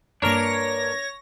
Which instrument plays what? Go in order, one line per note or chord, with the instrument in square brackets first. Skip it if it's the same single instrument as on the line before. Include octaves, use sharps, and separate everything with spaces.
[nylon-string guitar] G2 A#3 [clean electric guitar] D4 A#4 [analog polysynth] C#5 A#6